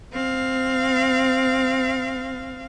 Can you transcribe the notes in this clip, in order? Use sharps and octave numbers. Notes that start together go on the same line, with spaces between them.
C4 F5